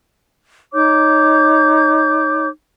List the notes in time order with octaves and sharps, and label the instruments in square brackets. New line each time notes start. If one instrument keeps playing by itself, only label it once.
[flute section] D#4 C#5 D6 G6